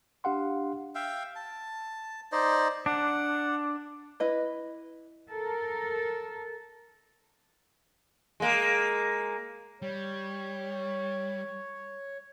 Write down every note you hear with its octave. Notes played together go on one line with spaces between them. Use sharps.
D4 G4 F5 F#5 C6
E5 F5 G5
A5
D#4 C5 D5 D#5
D4 F#5
E4 B4 D#5
A4 A#4
G#3 A#3
G3 C#5